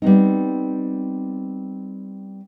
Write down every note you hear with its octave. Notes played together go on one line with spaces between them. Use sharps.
G3 B3 C4 D#4